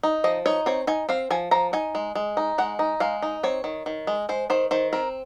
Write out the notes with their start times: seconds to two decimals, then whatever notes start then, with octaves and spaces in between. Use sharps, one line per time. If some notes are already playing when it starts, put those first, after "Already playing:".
0.03 D#4
0.24 F3 D#5
0.46 D#4 C#5
0.66 C4 C#5
0.87 D#4 G#5
1.09 C4 F5
1.30 F3 G#5
1.51 F3 A#5
1.73 D#4 G#5
1.95 G#3
2.15 G#3
2.37 D#4
2.58 G#3 F#5
2.79 D#4
3.00 G#3 F5
3.22 D#4
3.43 C4 C#5
3.64 D#3
3.86 D#3
4.07 G#3
4.29 G#3 C5
4.50 D#3 C5
4.71 D#3 C5
4.93 C4 A#4